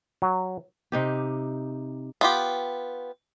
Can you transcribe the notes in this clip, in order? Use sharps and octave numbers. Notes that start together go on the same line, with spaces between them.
F#3
C3 D#4 G4
B3 F4 G4